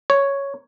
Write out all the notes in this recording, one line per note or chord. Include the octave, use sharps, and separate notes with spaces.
C#5